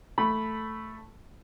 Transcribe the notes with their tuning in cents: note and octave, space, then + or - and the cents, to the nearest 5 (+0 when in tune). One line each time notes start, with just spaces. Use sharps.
A3 +0 B5 +0